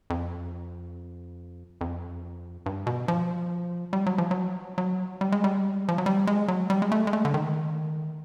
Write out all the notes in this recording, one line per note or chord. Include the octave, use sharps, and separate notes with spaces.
F2
F2
G2
B2
F3
G3
F#3
F3
F#3
F#3
G3
G#3
G3
F3
F#3
G3
G#3
F#3
G3
G#3
A3
G#3
A3
D3
D#3